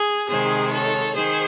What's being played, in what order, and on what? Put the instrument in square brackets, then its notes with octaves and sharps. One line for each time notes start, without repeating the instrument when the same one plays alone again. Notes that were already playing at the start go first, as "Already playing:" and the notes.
Already playing: [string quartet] G#4
C3 D#3 G#3 G#4 C5
A4 C#5
D#3 G#4 C5